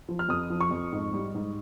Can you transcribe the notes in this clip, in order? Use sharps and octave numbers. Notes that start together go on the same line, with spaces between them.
F3
F6
F2 D#6
F3
C#6
F2
G#2
G3
G#2